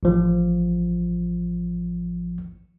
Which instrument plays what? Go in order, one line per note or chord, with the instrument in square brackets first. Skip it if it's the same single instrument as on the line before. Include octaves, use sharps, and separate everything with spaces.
[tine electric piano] A1 F3